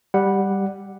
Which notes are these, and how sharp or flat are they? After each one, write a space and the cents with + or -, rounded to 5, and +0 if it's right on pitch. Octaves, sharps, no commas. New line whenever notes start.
G3 +0 F#5 +0